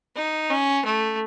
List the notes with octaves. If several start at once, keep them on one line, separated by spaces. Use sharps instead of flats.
D#4
C#4
A3